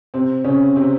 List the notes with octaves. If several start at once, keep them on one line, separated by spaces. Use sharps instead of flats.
C3 C4
C#3 C#4
C3 C4